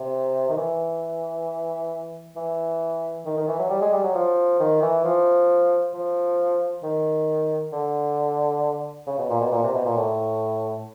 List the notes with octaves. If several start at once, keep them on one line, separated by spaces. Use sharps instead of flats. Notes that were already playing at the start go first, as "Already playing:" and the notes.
Already playing: C3
D#3
E3
E3
D#3
D#3
E3
F#3
G3
G#3
G3
F#3
F3
D#3
E3
F3
F3
D#3
D3
C#3
B2
A#2
B2
A#2
C3
B2
A#2
A2